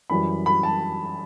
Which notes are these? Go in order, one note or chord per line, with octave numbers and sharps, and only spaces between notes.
F#2 E3 G3 B5
B5
A5